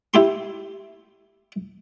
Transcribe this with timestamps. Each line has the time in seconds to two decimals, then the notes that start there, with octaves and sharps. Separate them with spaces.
0.14 E4 G4 C6